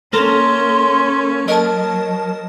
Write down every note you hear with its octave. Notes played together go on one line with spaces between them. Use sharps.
A#3 C#4 A4 A#4 C6
F#3 A#4 D#5 A5